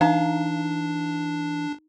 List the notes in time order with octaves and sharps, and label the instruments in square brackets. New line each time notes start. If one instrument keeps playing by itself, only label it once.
[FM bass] E3 [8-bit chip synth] D4 [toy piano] D#4 A#5 [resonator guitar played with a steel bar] F5